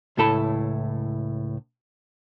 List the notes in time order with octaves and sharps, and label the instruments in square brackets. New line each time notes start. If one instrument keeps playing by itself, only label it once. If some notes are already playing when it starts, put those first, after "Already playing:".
[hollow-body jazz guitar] C#2 A2 E4 A4 A5 B5